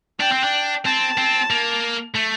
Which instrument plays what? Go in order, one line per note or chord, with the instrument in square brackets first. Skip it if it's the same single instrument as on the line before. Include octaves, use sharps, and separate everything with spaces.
[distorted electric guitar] D4 [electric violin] G5
[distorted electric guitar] C4
D4
[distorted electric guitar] C4 [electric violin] A5
[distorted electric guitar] C4
A#3
A3